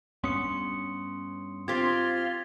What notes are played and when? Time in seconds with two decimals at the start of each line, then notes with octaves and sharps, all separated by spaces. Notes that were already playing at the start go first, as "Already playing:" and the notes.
0.24 G2 B3 C#4 C6 D#6 C#7
1.68 C4 F4 G4 G#6 A6 B6